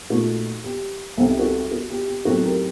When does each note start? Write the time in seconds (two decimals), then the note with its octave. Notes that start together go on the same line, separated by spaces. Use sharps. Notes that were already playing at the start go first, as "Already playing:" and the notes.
0.10 A#2 A3 D#4 F#4
0.64 G4
1.18 C2 C3 G3 C4 D#4 A4
1.29 G4
1.39 F#4 A4
1.71 F#4
1.90 G4
2.08 G4
2.25 A2 F#3 C4 D#4 F#4 A4
2.43 G4 A#4